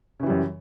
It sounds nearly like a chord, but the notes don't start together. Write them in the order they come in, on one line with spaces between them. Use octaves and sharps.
C#3 E3 G3 F#2